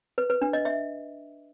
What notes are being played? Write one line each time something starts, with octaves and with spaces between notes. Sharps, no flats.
B4
B4
D4
D#5
E5